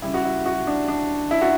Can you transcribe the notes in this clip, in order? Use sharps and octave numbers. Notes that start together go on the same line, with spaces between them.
C#3 G3 E4
F#4
E4
F#4
D4
D4
E4
F#4